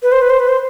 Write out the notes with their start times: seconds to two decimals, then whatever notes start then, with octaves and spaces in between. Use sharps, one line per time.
0.03 B4
0.12 C5
0.22 B4
0.30 C5
0.39 B4
0.48 C5